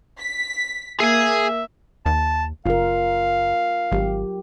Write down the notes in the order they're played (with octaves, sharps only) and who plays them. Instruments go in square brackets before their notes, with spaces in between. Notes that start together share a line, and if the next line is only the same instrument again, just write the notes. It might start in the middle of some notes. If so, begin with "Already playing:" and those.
[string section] B6
[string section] A#3 [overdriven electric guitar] G#4 G#5 [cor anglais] E5
[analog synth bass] D#2 [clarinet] A5
[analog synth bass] F#1 [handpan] F4 A#4 [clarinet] F5
[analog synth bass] G#1 [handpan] F#3 G4